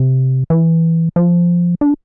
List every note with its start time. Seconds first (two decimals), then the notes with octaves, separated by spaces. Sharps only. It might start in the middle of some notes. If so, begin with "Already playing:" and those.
Already playing: C3
0.50 E3
1.16 F3
1.81 D4